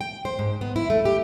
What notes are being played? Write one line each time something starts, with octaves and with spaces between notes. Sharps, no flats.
G5
C5
G#2
B3
E4
A3
G4